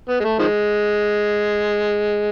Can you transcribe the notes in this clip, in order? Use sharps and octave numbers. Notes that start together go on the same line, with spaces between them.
B3
G#3
A3
D#3 F3 G#3